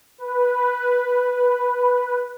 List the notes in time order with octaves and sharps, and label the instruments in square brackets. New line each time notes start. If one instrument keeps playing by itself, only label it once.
[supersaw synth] B4